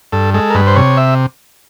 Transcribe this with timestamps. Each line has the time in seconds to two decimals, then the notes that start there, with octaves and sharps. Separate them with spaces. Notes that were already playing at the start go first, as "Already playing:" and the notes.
0.12 G2 A4
0.34 G#3 A4
0.50 A#4
0.55 G2 B4
0.67 C5
0.76 C3 C#5
0.97 E5